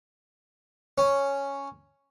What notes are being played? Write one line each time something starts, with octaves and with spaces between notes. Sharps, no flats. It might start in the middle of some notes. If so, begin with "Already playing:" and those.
C#4